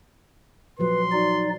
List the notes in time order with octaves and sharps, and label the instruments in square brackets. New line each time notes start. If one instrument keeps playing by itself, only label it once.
[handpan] A#2 F3 F#3 [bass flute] B4 [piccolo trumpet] C6
[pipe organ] D#4 D5 [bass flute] F#4